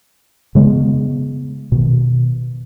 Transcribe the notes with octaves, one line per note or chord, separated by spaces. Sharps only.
C#3 G#3 A3 B3
B2 D#3